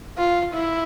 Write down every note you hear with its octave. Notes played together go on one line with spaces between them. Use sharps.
F4
E4